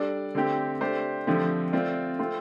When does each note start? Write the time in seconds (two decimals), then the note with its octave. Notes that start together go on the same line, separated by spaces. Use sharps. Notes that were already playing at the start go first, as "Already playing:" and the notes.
Already playing: G3 D4 A4 D5
0.35 D3 A3 C4 G4
0.81 A3 D4 G4 C5
1.27 D3 F3 A3 C4 G4
1.73 A3 C4 F4 D5
2.19 A3 C4 F4